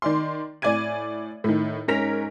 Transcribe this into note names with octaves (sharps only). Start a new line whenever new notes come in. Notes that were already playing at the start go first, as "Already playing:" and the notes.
D#3 D5 C6
A2 D5 G#5 G#6 D#7
A2 D#3
G#2 C#4 A#4 A#6 B6 F7